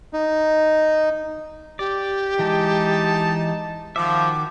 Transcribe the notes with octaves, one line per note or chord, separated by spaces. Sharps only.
D#4
G4 D5
E3 G#3 D#4 A5
D#3 F3 F#4 E5 D6